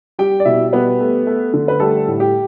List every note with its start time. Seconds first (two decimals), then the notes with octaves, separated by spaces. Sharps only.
0.19 G3 G4 G5
0.40 D5
0.45 B2 E4 E5
0.73 G3 B3 B4
1.00 A3
1.27 A3
1.53 D3
1.68 B4
1.80 G3 A3 A4
2.08 A2
2.20 G4